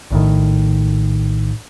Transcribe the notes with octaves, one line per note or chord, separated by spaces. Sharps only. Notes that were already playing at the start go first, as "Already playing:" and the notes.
A#1 A2 D#3